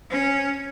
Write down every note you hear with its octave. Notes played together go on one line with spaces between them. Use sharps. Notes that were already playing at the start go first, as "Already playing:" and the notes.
C#4